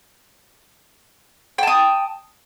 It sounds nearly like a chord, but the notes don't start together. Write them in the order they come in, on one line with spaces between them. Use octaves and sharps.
G5 A5 D#6